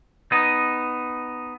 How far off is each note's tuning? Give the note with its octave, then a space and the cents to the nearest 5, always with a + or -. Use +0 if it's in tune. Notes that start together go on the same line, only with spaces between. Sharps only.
B3 +10 D#4 +0